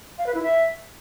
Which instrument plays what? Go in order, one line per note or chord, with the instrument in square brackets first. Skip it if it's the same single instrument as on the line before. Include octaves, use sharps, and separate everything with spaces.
[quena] F5
B4
E4
E5